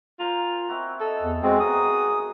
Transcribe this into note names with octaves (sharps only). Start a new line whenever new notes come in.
F4 A#4 C5 G#5
C4 E4 F#4
A4 D#5
E2 F#5
B2 G#3 C4 F#4 G#4
G3 A#4 D#6